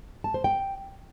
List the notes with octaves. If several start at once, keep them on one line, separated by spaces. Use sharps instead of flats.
A5
C5
G5